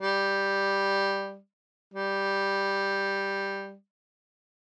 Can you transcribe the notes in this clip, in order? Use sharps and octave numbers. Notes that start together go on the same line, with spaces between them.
G3
G3